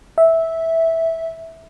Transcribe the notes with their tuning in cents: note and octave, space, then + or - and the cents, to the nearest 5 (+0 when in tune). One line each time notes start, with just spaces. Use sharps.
E5 -10